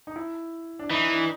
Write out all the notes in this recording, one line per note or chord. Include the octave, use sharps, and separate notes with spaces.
D#4
E4
D4
E3 D#4
D4